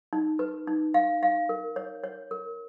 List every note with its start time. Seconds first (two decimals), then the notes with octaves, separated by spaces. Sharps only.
0.13 D#4
0.39 B4
0.67 D#4
0.94 F5
1.23 F5
1.49 A#4
1.76 C#5
2.04 C#5
2.31 A#4